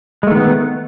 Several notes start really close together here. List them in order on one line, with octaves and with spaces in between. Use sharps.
G#3 A3 D#3 B3